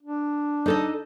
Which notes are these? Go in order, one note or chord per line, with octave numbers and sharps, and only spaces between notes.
D4
D#4 A4 D#5